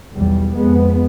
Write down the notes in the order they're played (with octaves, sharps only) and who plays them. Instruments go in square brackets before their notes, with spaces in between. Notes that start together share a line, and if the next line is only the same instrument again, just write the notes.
[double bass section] B1 E2 G3
F2 G#3 B3